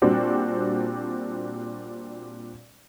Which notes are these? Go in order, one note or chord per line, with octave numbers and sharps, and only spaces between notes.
A#2 G3 C4 D4 F#4